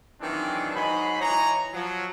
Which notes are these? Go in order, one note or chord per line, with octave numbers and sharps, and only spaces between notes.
D#3 E3 F#3 G#3 C4 D4
G#2 F#3 D#4 G#4 B5
E3 C#5 D#5 G#5 A#5
F3 F#3